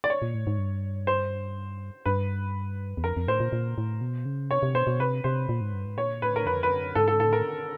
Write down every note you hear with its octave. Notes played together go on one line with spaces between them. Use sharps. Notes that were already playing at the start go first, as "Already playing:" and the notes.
D5
C#5
A#2
A2
G#2
G2
C5
G2 B4
E2
F2 A#4
F2
A2 C5
A#2
A#2
A2
B2
C#3
C3 C#5
C3
B2 C5
B2
C3 B4
C3 C5
A#2
G#2
G2
G#2
A#2 C#5
A2 B4
A#4
F2 B4
B4
F#2
G#2 A4
A4
A2 A4
A#4